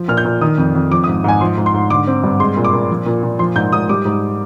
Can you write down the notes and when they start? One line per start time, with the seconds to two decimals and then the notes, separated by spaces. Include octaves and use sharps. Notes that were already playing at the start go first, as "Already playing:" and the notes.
Already playing: F3
0.08 A#2 F6
0.17 G6
0.25 A#2
0.41 D#3 D#6
0.58 F2
0.75 F2
0.91 F3 D6
1.04 D#6
1.08 G#2
1.24 G#2 G#5
1.41 F3 C6
1.58 G#2
1.66 C6
1.74 G#2
1.90 D3 D6
2.07 C4
2.24 G2
2.40 G#3 C6
2.57 A#2
2.64 D6
2.73 A#2
2.90 F3
3.06 A#2
3.23 A#2
3.39 F3 C6
3.56 G#2 G6
3.73 G#2 D#6
3.89 G3 D6
4.05 G#2